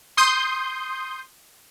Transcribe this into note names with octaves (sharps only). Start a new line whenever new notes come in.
C6 D#6 G6